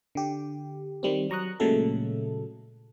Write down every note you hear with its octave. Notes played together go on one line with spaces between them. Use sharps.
D3 G4
D#3 G3 C4
F#3 A#5 C#6 D#6 F#6
A#2 C#3 F#3 G#3 A3 A4